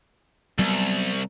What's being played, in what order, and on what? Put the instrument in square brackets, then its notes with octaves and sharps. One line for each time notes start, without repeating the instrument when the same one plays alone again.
[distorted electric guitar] C2 [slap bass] F#3 G3 B3